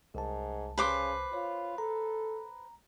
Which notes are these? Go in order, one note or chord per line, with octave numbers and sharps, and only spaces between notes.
C2 G#2 A5
C#3 B4 C5 D6
F4 C#5
A4 A#5